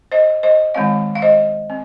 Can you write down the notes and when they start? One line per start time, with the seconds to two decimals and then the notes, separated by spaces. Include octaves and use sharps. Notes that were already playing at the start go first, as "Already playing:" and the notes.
0.12 C5 D#5
0.43 C5 D#5
0.74 D#3 G#3 C4 C#5 F5
1.15 F5
1.22 C5 D#5
1.70 C4